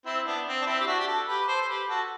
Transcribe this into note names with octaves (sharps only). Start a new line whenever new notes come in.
C4 E4
B3 D4
C4
D4
C4 E4
G4
D4 F#4
G4
F#4 A4
G4 B4
B4
A4 C5
C5
G4 B4
F#4 A4